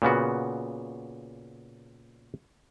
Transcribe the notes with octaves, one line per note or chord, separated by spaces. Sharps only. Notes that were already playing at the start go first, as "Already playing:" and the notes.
A#2 C#3 B3 F#4